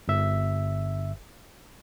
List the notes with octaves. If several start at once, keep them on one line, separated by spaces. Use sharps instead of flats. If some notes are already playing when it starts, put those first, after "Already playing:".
G1 E5